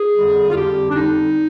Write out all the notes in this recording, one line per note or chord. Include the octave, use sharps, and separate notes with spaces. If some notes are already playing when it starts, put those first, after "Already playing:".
Already playing: G#4
F2 D3 G3
F4
F2 D3 G3 G4
D4
F2 D3 G3 D#4